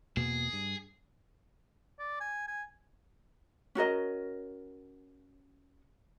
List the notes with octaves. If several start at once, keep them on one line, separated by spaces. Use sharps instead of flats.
E2 B2 A#3 G#4
G2
D5
G#5
G#5
C#4 F#4 A#4 D#5